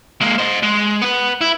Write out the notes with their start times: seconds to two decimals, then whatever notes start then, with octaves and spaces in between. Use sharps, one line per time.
0.21 G#3 A#3
0.38 C5 D#5
0.63 G#3
1.02 B3 B4
1.41 E4